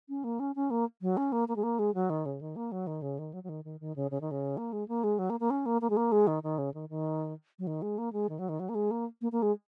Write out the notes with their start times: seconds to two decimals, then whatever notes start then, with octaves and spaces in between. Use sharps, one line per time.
0.09 C#4
0.24 A#3
0.40 C#4
0.56 C#4
0.71 A#3
1.02 F#3
1.17 C#4
1.32 A#3
1.48 A#3
1.56 G#3
1.63 A#3
1.79 G#3
1.94 F#3
2.10 D#3
2.26 C#3
2.41 D#3
2.56 A#3
2.72 F#3
2.87 D#3
3.02 C#3
3.19 D#3
3.34 F#3
3.44 F#3
3.49 D#3
3.65 D#3
3.80 D#3
3.96 C#3
4.11 C#3
4.21 D#3
4.31 C#3
4.57 A#3
4.73 G#3
4.88 A#3
5.04 G#3
5.19 F#3
5.30 A#3
5.40 A#3
5.50 C#4
5.66 A#3
5.81 A#3
5.90 G#3
5.97 A#3
6.12 G#3
6.27 D#3
6.43 D#3
6.58 C#3
6.74 D#3
6.89 D#3
7.59 F#3
7.67 D#3
7.82 G#3
7.98 A#3
8.13 G#3
8.29 D#3
8.39 F#3
8.49 D#3
8.60 F#3
8.69 A#3
8.75 G#3
8.91 A#3
9.22 A#3
9.32 A#3
9.42 G#3